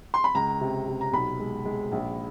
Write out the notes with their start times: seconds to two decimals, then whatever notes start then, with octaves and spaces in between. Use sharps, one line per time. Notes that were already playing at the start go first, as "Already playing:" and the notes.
0.14 C6
0.24 B5
0.35 C#2 A#5
0.61 C3
0.88 C3
1.01 A#5
1.13 B1 B5
1.40 G#3
1.65 G#3
1.92 A#1